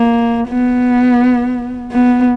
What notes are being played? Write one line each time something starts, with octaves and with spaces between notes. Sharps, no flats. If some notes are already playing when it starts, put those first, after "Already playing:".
Already playing: A#3
B3
B3